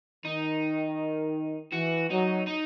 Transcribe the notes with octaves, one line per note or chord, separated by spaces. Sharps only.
D#3 D#4
E3 F#4
F#3 D#4
D#4